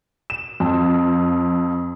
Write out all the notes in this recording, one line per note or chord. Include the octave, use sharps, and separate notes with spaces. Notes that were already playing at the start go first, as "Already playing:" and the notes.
E7
F2